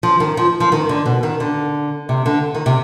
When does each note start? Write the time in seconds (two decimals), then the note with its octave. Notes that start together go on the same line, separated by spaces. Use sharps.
0.03 F3
0.20 D#3
0.37 F3
0.60 F3
0.72 D#3
0.89 D3
1.06 B2
1.23 D#3
1.40 D3
2.09 C3
2.26 D3
2.55 D#3
2.66 C3